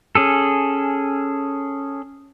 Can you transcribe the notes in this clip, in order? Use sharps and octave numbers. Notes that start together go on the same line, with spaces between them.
C#4 G#4 A4